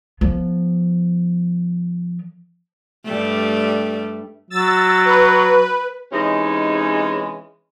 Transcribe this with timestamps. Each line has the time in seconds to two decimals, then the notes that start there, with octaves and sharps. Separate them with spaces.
0.21 F3 B3
3.05 G2 G3 A3
4.50 F#3 E6 A6
5.05 B4
6.11 C3 E3 G#3 C#4 D#4